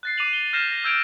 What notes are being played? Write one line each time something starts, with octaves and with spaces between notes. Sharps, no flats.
F#6 A6 C7
D6 C7 D#7 F7 F#7
G7
F6 G6 A#6 C7 E7
A#6
E6 G6 G#6 D7 F7